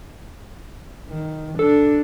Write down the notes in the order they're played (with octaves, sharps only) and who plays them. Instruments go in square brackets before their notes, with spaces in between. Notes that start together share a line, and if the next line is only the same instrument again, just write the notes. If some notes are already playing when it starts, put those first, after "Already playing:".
[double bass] D#3
[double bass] D4 [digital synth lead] A4